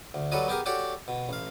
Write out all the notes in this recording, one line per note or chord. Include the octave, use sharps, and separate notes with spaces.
D2
F#3 G3 A4 B4 C#5 D#5
B3 G4 G#4 A#4
F#4 G4 A4 C#5 D5
B2
A1 F5